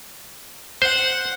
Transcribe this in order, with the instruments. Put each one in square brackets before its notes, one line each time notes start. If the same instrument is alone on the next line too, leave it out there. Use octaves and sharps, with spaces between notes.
[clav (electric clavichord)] C5 [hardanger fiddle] F#5